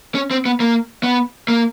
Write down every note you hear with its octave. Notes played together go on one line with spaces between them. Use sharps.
C#4
C4
B3
A#3
B3
A#3